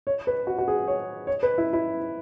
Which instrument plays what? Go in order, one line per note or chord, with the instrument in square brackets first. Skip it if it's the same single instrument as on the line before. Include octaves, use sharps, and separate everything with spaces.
[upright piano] C#5
B4
F#4
F#4
G#4
C#5
C#5
B4
E4
E4